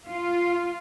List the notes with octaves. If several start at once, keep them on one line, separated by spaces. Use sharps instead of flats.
F4